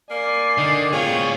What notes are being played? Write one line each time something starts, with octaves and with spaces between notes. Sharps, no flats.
A#3 D5 G#5 C7
D3 D#3
A2 C4 F4 G#4 C#5